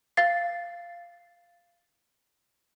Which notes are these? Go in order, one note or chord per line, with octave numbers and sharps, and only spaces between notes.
F5 A6 C7